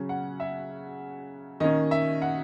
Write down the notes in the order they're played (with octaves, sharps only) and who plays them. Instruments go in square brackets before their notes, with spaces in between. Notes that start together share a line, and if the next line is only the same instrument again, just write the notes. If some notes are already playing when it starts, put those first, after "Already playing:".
Already playing: [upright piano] C#3 F#3 C#4
F#5
E5
D#3 A#3 C#4 D#5
E5
F#5